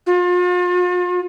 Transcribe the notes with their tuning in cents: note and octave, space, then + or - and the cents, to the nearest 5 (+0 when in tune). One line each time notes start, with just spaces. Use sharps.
F4 +40